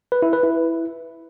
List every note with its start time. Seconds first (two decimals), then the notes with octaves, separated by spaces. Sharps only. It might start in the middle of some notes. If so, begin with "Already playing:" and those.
0.12 B4
0.22 E4
0.33 B4
0.43 E4